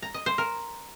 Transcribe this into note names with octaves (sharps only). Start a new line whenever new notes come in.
A#5
D#5
C5
A#4